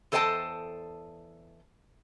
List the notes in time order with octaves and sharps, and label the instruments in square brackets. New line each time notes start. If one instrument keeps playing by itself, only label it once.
[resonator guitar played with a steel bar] E2 A4 C5 D#5 G5 A5